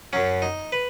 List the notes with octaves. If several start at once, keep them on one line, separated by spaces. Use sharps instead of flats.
F#2 F#3 C#4
D#4
B4